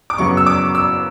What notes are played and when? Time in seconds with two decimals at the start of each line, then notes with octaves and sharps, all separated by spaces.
0.10 D6
0.18 F#2 C#3 F#3 B3 C#6
0.37 E6
0.46 D6
0.75 E6